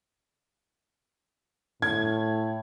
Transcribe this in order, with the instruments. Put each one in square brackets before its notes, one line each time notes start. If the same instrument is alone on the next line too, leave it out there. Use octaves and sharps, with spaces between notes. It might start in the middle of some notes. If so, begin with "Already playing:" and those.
[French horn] A2 [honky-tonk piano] G#6